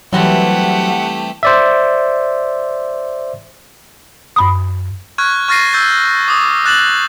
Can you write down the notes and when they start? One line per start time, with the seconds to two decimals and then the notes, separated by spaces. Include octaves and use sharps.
0.13 E3 F#3 G3 A3 C4 G4 F#5
1.43 C5 D5 E5
4.36 F#2 B5 D#6
5.18 C#6 F6 F#6 G#6
5.48 C#6 F6 A6 A#6 C7 D#7
5.73 E6 G6 A6
6.28 D6 D#6
6.65 D6 F#6 A6 E7 F#7